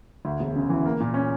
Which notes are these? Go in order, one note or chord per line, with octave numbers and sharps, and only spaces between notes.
D2
E1
C#3
E3
A#3
A#2
C#4